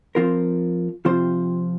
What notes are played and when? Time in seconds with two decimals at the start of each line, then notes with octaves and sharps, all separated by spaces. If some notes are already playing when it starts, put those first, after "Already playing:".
0.15 F3 C4 F4 A#4
1.05 C3 F3 C4 F4 C5